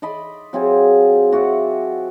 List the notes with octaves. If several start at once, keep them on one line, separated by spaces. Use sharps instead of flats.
D5 D#5 B5 C6
F#3 C4 F4 G#4
F#4 D5 E5 F#5